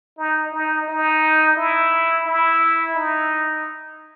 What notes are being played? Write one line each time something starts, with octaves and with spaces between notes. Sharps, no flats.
D#4
D#4
D#4
E4
E4
D#4